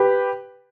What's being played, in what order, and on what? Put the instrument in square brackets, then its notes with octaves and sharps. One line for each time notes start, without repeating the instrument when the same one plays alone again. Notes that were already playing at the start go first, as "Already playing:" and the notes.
Already playing: [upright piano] G4 B4